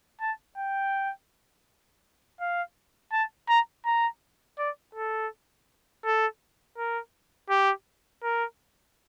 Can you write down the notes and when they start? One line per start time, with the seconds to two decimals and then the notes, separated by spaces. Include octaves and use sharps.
0.21 A5
0.57 G5
2.40 F5
3.12 A5
3.49 A#5
3.85 A#5
4.58 D5
4.95 A4
6.05 A4
6.78 A#4
7.50 G4
8.23 A#4